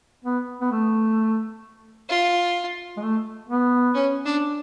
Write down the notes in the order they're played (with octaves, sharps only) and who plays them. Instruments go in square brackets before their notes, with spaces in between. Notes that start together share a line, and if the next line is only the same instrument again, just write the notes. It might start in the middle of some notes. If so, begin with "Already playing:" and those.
[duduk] B3
B3
A3
[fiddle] F4
[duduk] G#3
A3
B3
[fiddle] C#4
D4